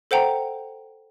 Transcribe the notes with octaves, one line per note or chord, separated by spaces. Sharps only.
A4 C5 F#5 G5 A#5